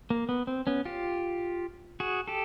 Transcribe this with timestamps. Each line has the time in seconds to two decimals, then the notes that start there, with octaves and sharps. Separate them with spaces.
0.10 A#3
0.29 B3
0.47 C4
0.67 B3 C#4
0.85 F4 G4
2.00 F#4 G#4
2.28 G4 A4